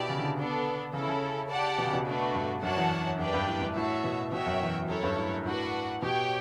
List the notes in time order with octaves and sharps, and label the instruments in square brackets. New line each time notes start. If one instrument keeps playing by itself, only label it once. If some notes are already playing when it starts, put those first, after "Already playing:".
Already playing: [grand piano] B2 [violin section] E4 G4 D5 A5
[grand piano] C#3
D3
[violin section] B3 D4 A4
[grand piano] C#3 [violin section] C#4 E4 A4
[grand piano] C#3
[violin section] G4 D5 F#5 A5
[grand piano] B2
C#3
B2
[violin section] A3 D4 F#4 B4
[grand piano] G2
[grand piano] F#2 [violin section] D4 F#4 C#5 F#5 A5
[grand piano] E2
[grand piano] F#2 [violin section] D4 G4 B4 D5 G5
[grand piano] G2
A2
G2
[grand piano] A2 [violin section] F#4 C#5 E5 A5
[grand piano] B2
[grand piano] B2 [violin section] F#4 C#5 E5 G5
[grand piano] F#2
E2
[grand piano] F#2 [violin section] E4 A4 C#5
[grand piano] G2
A2
[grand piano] A2 [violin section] D4 F#4 B4 F#5
[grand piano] B2 [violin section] G4 C#5 G5